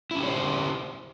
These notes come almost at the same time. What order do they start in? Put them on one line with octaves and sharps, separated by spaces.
E4 C#4 G4 C#5 C5